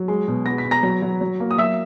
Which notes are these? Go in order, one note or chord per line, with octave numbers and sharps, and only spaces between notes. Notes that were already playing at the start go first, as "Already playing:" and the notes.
Already playing: F#3
G#3
B2
B3 A#6
B6
B3
A#5 A#6
F#3
F#3
F#3
A#3
D#6
F#3 E5 E6